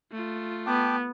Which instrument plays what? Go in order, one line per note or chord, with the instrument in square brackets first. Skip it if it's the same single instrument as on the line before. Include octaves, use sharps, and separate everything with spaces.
[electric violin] A3 F4
[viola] B3 [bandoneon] G5 A5 D6